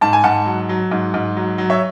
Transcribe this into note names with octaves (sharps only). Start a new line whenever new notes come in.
G#2 A5
G#5
G#2 F#5 A5
F#3
F#3
G#2
G#2
F#3
F#3
C#5 E5